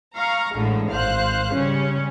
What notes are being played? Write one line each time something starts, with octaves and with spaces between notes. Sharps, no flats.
F5 A#5 C#6
A1 A2 D3 G#3
G#1 C5 F5 F#6
C#3 G3 C#4